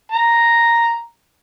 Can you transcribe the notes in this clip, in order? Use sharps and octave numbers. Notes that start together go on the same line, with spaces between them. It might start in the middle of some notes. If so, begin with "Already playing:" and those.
A#5